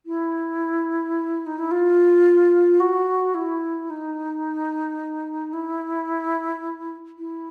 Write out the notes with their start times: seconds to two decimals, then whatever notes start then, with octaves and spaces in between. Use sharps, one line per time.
0.06 E4
1.46 D#4
1.58 E4
1.71 F4
2.80 F#4
3.34 E4
3.90 D#4
5.53 E4
7.18 E4